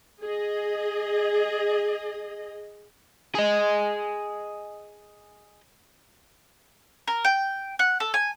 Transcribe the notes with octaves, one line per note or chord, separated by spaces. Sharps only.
G#4 D#5
G#4 D#5
A#4
G5
F#5
A4
G#5